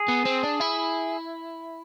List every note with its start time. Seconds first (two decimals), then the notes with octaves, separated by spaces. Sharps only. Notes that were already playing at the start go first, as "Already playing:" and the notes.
Already playing: G#4
0.09 B3
0.26 C4
0.44 D4
0.61 E4